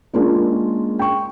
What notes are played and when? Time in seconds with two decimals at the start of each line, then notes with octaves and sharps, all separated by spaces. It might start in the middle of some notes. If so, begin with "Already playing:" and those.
0.13 G#3 A#3 C#4 D4 F4 A#4
0.99 G5 C#6